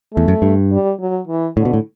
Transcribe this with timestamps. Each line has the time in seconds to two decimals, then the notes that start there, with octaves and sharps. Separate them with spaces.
0.13 E2 A3
0.28 F#2
0.42 G2
0.71 G3
1.00 F#3
1.27 E3
1.56 A2 D3
1.65 B2
1.73 A2